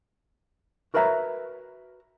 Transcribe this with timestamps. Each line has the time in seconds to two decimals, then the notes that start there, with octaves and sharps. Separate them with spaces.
0.94 F#4 A#4 B4 C#5 E5 A#5